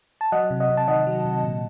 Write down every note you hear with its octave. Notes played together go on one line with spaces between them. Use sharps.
A5
F#3 D#5 F#5
C3
D#5 F#5
C3
A5
D#3 D#5 F#5
F#3
C3
A#2